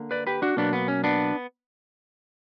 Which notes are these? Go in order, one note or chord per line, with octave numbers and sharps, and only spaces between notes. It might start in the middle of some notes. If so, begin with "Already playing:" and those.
Already playing: D3 A#3
B4 D5
G4 B4
D4 F#4
B2 F#3 A#3 B3 D4
B3
C#4
B3 D4